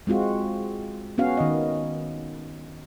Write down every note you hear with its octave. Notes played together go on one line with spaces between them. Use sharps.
G#3 C4 F4 F#4
B3 C#4 F#4 F5
D#3 D#5